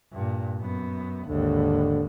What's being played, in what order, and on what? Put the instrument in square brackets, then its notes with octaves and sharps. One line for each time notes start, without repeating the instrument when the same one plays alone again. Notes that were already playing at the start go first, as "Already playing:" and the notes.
[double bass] G2 A#2
F#2 B3
[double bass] G#1 D#2 [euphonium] D3